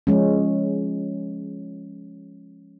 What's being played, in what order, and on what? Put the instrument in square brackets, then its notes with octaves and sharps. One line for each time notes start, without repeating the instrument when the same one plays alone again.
[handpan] F3 G#3 C#4